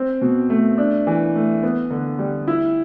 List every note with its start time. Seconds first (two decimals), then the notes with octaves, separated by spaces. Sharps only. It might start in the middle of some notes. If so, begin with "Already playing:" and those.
Already playing: C4
0.22 B2
0.50 A3
0.78 D4
1.07 E3
1.35 A3
1.63 B3
1.91 D3
2.19 G3
2.48 E4